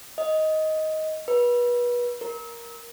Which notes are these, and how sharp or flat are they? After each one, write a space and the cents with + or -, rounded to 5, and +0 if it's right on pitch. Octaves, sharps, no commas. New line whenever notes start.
D#5 +10
B4 -30
A#4 +10